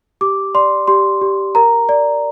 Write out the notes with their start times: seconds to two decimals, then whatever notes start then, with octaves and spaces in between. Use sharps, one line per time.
0.21 G4 D6
0.55 D5 C6
0.87 G4 C6
1.21 G4
1.55 A#4 A#5
1.89 D5